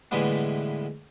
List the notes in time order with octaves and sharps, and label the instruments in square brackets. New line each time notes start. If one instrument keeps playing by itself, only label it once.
[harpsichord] A2 D3 E3 G3 G#3 B3